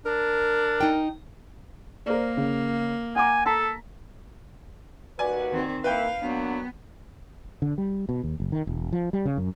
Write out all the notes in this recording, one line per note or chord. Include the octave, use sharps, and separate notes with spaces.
D4 A#4
D#4 G5
A#3 A#4 C5 D5
C#3
F#5 G#5 A#5 D6
A4 A5 A#5 B6
D#2 F#4 B4 D5 G#5
D#3 C4
A#3 E4 B4 F5 G5 G6
F#3 A#3 B3 D4
D3
G3
B2
D#2
F#1
D#3
E1
F3
G3
C#3
F#2